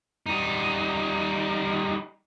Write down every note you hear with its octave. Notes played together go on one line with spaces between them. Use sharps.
G3 D#4